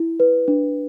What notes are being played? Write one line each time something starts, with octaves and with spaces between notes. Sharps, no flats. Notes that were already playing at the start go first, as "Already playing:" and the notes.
Already playing: E4
B4
D4